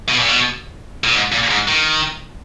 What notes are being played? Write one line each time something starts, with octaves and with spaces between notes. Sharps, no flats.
B2
A#2
B2
A#2
G#2
A#2
G#2
D#3